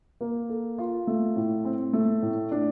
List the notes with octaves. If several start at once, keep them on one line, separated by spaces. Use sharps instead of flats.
A#3
A4
F4
A3
A2
C4
A3
A2
D4